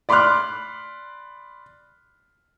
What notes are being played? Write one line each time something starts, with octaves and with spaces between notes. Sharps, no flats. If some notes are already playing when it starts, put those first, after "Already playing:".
D5 B5 C6 D6 F6 F#6